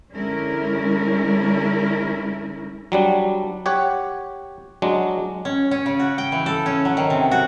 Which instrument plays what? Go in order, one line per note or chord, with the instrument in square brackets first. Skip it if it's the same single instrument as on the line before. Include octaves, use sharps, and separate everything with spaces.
[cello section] D3 G#3 C#4 E4 A#4
[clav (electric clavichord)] F#3 G3 D4
G4 C#5 F#5
F#3 G#3 D4
[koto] C#4
C#4
C#3
F#4
G5
E3
A4
C#4
F#3
D#3
C3
F#4